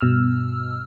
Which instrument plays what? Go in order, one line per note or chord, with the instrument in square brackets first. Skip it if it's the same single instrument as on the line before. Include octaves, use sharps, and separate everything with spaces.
[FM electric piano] G2 B2 E6 F6